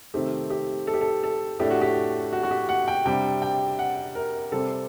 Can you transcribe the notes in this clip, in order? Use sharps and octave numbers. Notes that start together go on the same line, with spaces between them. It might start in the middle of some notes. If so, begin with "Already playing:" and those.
C3 D#3 A3 C4 G4
G4
A4
G4
A4
A4
A2 A3 D4 G4
F#4
G4
F#4
F#4
G4
F#5
G5
C3 G3 D4 G5
G5
F#5
A#4
C3 G3 C4 A4